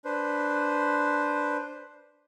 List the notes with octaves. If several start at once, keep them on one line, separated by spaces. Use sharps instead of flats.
D4 B4 C5